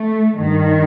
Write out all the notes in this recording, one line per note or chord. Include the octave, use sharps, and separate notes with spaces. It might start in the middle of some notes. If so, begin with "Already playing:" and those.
Already playing: A3
G2 D#3